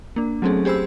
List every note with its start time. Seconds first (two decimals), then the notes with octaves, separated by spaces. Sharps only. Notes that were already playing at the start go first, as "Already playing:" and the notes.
0.16 A#3 D4
0.42 F#3 A3 C4 C#4 G#4 A4
0.65 G4 G#4 C5 B5 E6